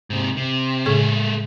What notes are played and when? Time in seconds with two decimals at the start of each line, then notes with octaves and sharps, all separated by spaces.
0.10 G#2 C3
0.37 C3
0.86 A2 C#3 G#3 A3 G#4